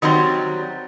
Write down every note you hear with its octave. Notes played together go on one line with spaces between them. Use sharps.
D#3 F#3 G3 C4